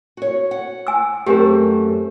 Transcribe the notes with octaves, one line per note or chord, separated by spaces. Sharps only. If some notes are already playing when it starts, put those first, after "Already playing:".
F#4 C#5
F#5
G#5 E6
F#2 A3 C4 G4 G#4 A#4